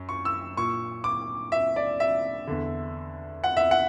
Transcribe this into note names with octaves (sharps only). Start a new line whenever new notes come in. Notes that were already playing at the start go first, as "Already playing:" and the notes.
Already playing: F#2
C#6
E6
A#2 C#6
D6
E5
D5
E5
E2 D3
F#5
E5
F#5